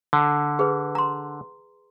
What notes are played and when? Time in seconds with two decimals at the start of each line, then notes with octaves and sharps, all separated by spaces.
0.13 D3
0.59 G#4 B4
0.95 A#5 C6